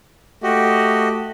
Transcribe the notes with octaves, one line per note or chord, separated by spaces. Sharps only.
A3 F#4 G4 D#5